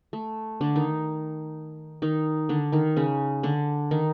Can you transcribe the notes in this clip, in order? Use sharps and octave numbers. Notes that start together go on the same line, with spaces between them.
A3
D3 D4
D#3 D#4
D#3 D#4
D3 D4
D#3 D#4
C#3 C#4
D3 D4
D#3 D#4